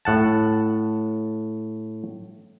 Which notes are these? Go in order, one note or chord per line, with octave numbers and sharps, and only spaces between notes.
A2 F#5 A5